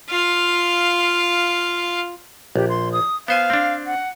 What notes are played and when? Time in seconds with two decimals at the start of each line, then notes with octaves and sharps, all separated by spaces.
0.10 F4 F5
2.56 A#1 G4
2.69 C6
2.92 D#6
3.28 B3 C5 F5 G#5
3.50 C4 D4
3.86 F#5